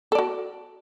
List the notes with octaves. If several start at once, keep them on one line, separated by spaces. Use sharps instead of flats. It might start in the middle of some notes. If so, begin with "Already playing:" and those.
F#4 A4 D5